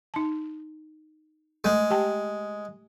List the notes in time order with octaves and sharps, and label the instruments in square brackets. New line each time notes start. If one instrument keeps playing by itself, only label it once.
[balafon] D#4 A5
[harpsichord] G#3 [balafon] A3
[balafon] G4 G5 A5